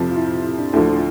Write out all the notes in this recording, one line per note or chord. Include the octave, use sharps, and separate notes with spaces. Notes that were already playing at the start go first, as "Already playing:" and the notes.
Already playing: F2 C3 F3
F4
E4
E4
D4
D2 D3 F3 E4